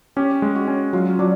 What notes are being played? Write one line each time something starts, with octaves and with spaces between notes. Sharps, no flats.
C#4 G4
G#3
F#4
C#4
F#3 F4
F#3 D4